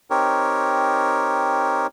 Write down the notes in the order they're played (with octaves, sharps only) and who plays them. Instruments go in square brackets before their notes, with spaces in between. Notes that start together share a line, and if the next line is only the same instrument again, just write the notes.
[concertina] C4 D#4 G4 A#4 C#5